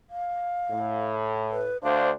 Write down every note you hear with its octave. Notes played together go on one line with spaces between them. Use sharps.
F5
A2
B4
D2 D4 C5 F5